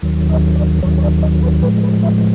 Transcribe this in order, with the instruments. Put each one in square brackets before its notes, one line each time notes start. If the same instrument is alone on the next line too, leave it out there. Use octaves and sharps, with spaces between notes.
[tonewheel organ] D#2 D#3 F#3
D#5
D5
D#2 D#3 F#3 C#5
C#5
D5
D#5
B4
A2 F3 G#3 B4
B4
E5